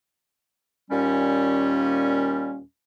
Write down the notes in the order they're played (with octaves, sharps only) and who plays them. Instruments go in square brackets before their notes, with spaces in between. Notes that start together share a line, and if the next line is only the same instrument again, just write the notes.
[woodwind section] D#2 A#2 G3 C#4